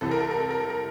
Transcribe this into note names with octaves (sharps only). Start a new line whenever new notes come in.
C2 C3 E3 A4
A#4
A4
A#4
A4
A#4
A4
A#4